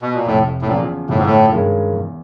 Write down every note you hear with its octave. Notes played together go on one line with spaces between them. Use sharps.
B2
A#2
F1 A2
A2
E2 A#2 C#3 F3
G1 A2
G#2
A2
G2 D#3 G#3 C#4
E2